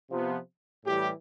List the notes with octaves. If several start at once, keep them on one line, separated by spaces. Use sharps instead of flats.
C3 F3 B3
A2 E3 G3 G4